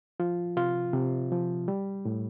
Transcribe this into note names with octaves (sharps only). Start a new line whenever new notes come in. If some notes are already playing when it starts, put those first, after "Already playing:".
F3 F4
C3 F4
C3
F3
G3
A2